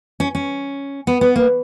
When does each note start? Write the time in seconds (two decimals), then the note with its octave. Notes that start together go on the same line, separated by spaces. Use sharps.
0.20 C#4
0.35 C#4
1.07 B3
1.21 B3
1.36 A#3